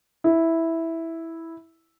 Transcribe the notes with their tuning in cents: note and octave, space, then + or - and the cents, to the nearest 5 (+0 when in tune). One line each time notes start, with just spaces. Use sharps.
E4 -5